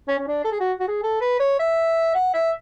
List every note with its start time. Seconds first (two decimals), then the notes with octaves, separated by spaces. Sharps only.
0.08 C#4
0.19 C#4
0.28 D4
0.44 A4
0.52 G#4
0.60 F#4
0.80 F#4
0.88 G#4
1.03 A4
1.21 B4
1.40 C#5
1.59 E5
2.15 F#5
2.34 E5